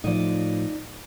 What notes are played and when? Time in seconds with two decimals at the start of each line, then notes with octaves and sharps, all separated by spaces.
0.04 A2 F3 D#4 D5